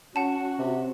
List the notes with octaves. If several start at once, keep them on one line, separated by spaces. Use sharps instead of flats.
C#4 F#4 F#5 A5
C3